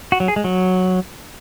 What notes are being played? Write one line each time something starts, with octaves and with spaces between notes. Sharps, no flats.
F#4
F#3
G#4
G#3
F#3